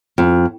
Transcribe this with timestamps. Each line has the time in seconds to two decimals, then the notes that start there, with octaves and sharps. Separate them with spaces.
0.18 F2